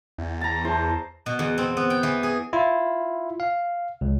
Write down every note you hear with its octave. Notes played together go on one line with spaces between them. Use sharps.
E2
A5 A#5
E4 C5 A5
B2
E2
C4
B3
G5
E3
G#4
E4 F4
F5
C#2